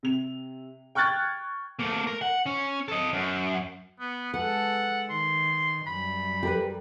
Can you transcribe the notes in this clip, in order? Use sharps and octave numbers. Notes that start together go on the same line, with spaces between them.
C3 F7
G5 C#6 F6 F#6 G#6 A6
A3 A#3
A#4
F#5
C#4
A4 D#5
F#2
B3
G#3 A4 B4 F#5
D#3 C6
F#2 G3 B5
G4 A#4 B4